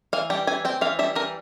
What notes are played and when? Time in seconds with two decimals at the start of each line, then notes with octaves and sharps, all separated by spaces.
0.13 E3 F5
0.30 G3 G5
0.47 E3 G#5
0.65 C4 G5
0.81 E3 F5
0.99 G3 E5
1.15 E3 A#4